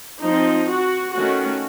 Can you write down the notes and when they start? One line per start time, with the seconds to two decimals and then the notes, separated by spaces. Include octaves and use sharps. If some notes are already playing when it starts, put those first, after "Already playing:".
0.23 F3 C4 D#4
0.69 F#4
1.15 D#3 A3 C#4 F#4